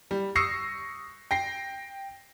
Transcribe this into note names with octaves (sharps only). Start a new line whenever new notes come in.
G3
C#6 D#6 E6 A#6 C7 C#7
G5 A#6 C7